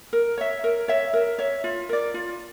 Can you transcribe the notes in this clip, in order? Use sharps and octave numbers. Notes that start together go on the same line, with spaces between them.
A#4
C#5 E5
A#4
C#5 E5
A#4
C#5 E5
F4
A#4 D5
F4